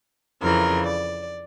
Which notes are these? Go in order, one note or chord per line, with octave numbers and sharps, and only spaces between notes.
F2 C#3 E3 A#4
D5